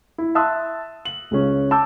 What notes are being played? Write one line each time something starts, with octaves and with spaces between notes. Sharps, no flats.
E4
E5 A5 C6 D#6 E6 F#6
F#7
C#2 C#3 C#4
A5 D6 E6 G6